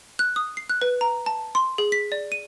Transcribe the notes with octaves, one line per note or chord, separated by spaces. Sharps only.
F#6
D#6
C7
F#6
B4
A#5
A5
C6
G#4
B6
D5
D#7